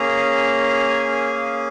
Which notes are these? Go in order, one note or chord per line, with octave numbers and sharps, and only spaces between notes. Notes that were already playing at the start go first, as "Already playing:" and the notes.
Already playing: A#3 C#4 G#4 A#5
G#5
G#5
F5